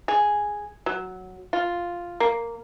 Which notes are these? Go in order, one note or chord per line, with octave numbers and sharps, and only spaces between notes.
G#4
F#3
F4
A#3